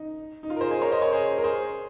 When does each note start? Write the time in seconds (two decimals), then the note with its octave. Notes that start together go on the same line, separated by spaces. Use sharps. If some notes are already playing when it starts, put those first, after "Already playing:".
Already playing: D#4
0.43 D#4
0.50 F4
0.56 A#4
0.60 G#4 C5
0.71 G#4 C5
0.81 A#4 C#5
0.92 C5 D#5
1.02 A#4 C#5
1.13 G#4 C5
1.38 A#4
1.44 G#4 C5